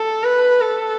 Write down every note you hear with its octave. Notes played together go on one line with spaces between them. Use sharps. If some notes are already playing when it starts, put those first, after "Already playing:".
Already playing: A4
B4
A4